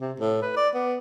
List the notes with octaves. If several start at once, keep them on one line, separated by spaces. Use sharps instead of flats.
C3
A2
B4
D5
B3